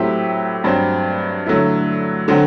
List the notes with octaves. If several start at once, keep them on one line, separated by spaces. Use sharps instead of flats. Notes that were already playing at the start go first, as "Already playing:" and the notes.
Already playing: A2 F#3 C4 E4 G4
G2 F#3 C4
D3 F#3 A3 E4
D3 F#3 C4 F#4